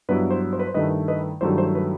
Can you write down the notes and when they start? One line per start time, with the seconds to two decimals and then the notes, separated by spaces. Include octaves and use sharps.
0.09 G2 F#3 B3 E4 B4
0.31 C5
0.53 C5
0.60 B4
0.67 C5
0.74 G2 D#3 A3 E4 B4 D#5
1.08 B4 D#5
1.41 G2 D#3 F#3 A3 E4 C5
1.58 C5
1.75 B4